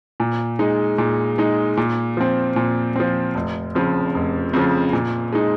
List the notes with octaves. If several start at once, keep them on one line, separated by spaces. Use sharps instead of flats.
A#2
G#3 D#4
A#2
G#3 D#4
A#2
F3 C4
A#2
F3 C4
F1
F2 C#3 F3
F1
F2 C#3 F3
A#2
G#3 D#4